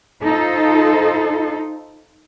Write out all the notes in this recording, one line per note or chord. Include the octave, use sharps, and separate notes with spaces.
D#4 F4 A4 C5